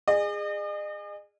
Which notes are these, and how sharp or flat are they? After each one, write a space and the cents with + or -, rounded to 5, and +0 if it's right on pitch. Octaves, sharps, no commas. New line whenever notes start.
G#4 -15 D#5 -40